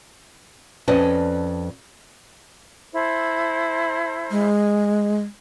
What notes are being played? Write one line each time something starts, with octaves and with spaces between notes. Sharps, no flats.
F2 C#4 B4 D5 D#5 A5
E4 A4 C5
G#3